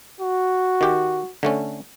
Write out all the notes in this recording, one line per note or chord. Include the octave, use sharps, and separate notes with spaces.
F#4
D#3 G4
D3 A3 C#4